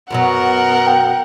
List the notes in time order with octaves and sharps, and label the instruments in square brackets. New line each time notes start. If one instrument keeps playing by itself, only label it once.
[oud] F#2 B2 F#3 [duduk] B3 [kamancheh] A#4 F#5
[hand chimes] G5